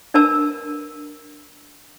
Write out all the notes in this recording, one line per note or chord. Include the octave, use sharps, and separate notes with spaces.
D4 A#4 B4 A5 E6